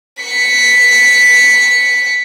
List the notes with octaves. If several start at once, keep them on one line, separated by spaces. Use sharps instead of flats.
B6 C#7